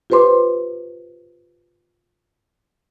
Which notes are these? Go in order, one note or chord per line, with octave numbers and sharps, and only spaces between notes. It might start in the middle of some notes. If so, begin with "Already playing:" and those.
F4 G4 B4 C5 C6 D6